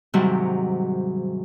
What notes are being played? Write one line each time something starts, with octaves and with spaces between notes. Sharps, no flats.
G#2 C3 D#3 F#3 G3